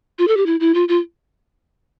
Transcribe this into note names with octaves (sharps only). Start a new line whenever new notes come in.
F4
A4
G4
E4
E4
F4
F4